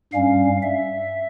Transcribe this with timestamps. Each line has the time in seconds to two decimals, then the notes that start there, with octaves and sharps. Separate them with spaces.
0.13 G2 G3 C#4 F5
0.63 E5